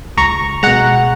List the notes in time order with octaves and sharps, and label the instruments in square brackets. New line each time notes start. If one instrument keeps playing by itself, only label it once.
[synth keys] C#2 A#5 C#6
B2 G#3 F#5 A#5